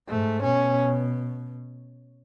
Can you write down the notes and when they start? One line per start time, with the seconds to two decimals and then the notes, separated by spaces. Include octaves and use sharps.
0.08 G#2 A3
0.43 B2 C#4